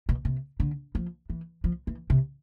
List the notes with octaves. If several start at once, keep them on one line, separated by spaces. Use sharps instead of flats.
B2
C3
D3
F3
E3
F3
E3
C3